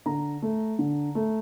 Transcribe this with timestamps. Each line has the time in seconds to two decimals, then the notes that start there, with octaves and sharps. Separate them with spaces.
0.06 D3 A#5
0.42 A3
0.79 D3
1.15 A3